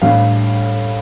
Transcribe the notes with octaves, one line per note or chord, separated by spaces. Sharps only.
A2 G3 D4 F5